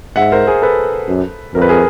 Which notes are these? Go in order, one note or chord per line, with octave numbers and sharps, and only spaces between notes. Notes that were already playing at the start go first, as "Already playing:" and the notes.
G#2 E5 F#5
A#4 C5
G#4 A#4
A4 B4
F#2
F2 A#4
B4
G#4 A#4